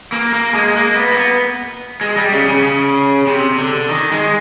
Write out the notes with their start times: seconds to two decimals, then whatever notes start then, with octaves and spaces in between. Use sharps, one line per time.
0.12 A#3
0.33 A#3
0.54 G#3
0.76 A#3
0.96 B3
1.11 A#3
1.17 B3
2.01 G#3
2.17 G3
2.33 C#3
2.49 C#3
3.27 C3
3.58 D3
3.90 D#3
4.12 G#3